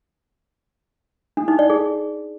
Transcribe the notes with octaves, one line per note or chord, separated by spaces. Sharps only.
D4
D#4
D5
G#4